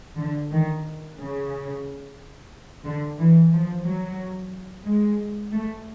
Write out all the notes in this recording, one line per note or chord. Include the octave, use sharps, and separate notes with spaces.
D3
D#3
C#3
D3
E3
F3
F#3
G#3
A3